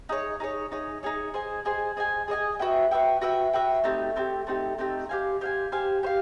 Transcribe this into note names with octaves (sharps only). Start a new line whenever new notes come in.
D#4 G#4 C#5
D#4 G#4 C#5
D#4 G#4 C#5
D#4 G#4 C#5
G#4 C5 D#5 G#5
G#4 C5 D#5 G#5
G#4 C5 D#5 G#5
G#4 C5 D#5 G#5
F#4 B4 E5 G5
F#4 B4 E5 G5
F#4 B4 E5 G5
F#4 B4 E5 G5
A3 C4 D#4 G4
A3 C4 D#4 G4
A3 C4 D#4 G4
A3 C4 D#4 G4
G4 C5 F5 G#5
G4 C5 F5 G#5
G4 C5 F5 G#5
G4 C5 F5